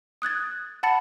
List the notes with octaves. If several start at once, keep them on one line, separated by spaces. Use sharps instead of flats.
D#6 F#6 G#6 A6
F#5 A5 B5 A6 C#7